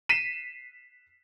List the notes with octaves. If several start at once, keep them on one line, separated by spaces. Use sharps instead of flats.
B6 C7 D#7 E7